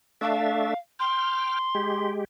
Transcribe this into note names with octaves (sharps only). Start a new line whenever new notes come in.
A3 D4 E5 F5
G5 C6 F6
G#3 G4